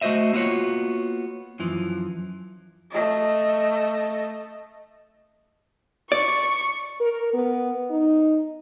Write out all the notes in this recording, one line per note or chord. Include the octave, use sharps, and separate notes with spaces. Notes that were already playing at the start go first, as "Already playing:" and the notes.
A3 F#4 G4 C5 D#5 E5
A#3 B3 F4 F#4 C#5
F#2 E3 F3
A3 D#5
D5 C#6
A#4
B3
D#4